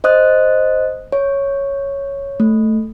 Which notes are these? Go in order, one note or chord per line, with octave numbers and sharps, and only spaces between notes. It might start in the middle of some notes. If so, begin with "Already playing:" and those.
C5 D#5 D#6 F#6
C#5
A3